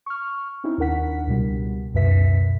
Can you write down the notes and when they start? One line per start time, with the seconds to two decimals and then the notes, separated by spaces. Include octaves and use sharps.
0.06 C#6 F6
0.64 C4 C#4 D#4 E4
0.78 D#2 D4 A#4 F#5 B6
1.27 C#2 B2 G3
1.94 C#2 F#2 B2 B4 E5 B6